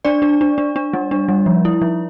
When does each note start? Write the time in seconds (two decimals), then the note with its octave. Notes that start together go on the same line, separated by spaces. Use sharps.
0.05 D4 D5
0.22 D4
0.41 D4
0.58 D4
0.76 D4
0.93 G3
1.11 D4
1.29 G3
1.46 F3
1.65 E4
1.82 F3